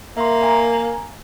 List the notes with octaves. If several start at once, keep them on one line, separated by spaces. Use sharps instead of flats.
A#3 E5 C6
G#5 A#5